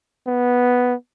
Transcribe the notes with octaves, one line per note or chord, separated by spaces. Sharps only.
B3